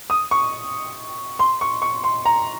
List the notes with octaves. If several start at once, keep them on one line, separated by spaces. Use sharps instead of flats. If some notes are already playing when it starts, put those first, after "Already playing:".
D#6
C#6
C6
C#6
C#6
C6
A#5